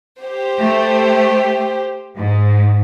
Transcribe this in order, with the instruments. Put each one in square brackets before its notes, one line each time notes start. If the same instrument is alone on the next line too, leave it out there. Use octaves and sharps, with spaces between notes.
[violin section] G4 C5
[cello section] A3
G#2